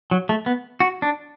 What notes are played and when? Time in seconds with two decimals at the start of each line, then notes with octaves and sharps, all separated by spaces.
0.11 F#3
0.29 A3
0.46 B3
0.80 F#4
1.02 D4